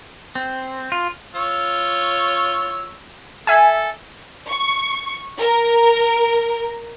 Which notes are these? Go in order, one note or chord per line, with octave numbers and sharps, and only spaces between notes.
C4
F4
F4 C#5 E6
A4 E5 G#5
C#6
A#4